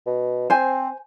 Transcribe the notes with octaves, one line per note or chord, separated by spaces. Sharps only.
B2
C4 C5 G#5